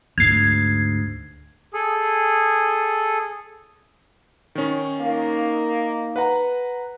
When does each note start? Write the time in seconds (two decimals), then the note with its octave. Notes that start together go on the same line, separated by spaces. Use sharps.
0.18 D2 G#2 G#6 C7
1.73 G#4 A4
4.55 D#3 C#4
5.01 A#3 D#4
6.16 B4 F#5 A#5